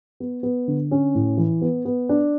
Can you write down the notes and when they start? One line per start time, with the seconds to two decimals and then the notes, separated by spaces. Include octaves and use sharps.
0.20 B3
0.43 B3
0.68 D3
0.91 C#4
1.15 A2
1.37 E3
1.62 B3
1.85 B3
2.09 D4